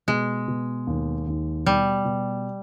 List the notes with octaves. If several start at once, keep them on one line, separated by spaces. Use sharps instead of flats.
B2 G#3
B2
D#2
D#2
B2 G3
B2